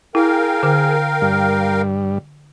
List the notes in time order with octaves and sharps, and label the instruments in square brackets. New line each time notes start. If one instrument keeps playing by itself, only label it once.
[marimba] E4 [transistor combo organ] G#4 [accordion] A#4 F5 G5
[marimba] D3
[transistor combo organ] G2 G3